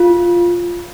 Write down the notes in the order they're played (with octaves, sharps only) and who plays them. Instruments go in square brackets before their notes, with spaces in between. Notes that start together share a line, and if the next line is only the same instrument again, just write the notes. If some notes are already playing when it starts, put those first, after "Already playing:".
Already playing: [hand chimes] F4